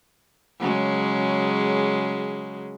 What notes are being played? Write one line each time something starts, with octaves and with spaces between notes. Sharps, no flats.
C#3 F#3 G#3